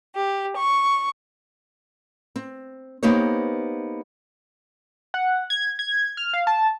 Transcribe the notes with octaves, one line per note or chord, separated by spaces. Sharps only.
G4
C#6
C4
A#3 B3 D#4 G4 C5 C#5
F#5
G#6
G#6
F6
F5
A5